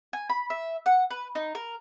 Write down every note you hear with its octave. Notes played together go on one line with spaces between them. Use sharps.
G#5
B5
E5
F#5
B4
D#4
A#4